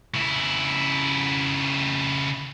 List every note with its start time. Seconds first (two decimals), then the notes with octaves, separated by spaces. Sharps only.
0.14 C#3 E4